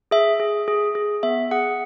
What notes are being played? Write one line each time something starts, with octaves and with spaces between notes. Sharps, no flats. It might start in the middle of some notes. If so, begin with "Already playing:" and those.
G#4 E5
G#4
G#4
G#4
B3 E5
G#4 F#5